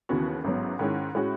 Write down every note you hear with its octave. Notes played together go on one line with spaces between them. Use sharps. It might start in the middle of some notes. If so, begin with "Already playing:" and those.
D#2 C#3 E3 B3 F#4
A1 G#2 F#3 B3
G#2 D#3 G#3 C#4 E4
A2 G#3 C#4 F#4